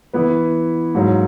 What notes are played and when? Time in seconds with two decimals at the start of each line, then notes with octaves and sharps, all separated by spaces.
0.13 E3 B3 E4 B4
0.95 G#2 F#3 A#3